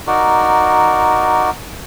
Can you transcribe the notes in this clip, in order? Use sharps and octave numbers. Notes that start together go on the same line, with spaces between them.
D#4 F#4 A#4 D5